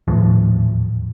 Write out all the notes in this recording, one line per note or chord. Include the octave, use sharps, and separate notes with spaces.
D#1 E2 A2 F3